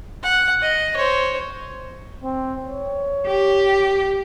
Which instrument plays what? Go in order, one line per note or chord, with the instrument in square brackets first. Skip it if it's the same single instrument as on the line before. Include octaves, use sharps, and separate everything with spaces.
[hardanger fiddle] F#5
D#5
C5 C#5
[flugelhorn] C4
C#5
[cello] G4